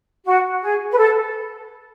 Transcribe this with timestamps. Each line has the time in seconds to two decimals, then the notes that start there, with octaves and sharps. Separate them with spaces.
0.25 F#4
0.62 G#4
0.90 B4
0.97 A4